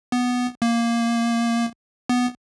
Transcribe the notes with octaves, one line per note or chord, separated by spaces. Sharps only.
B3
A#3
B3